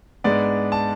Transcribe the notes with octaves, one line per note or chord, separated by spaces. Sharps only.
G#2 G#3 B3 D4 D5
A5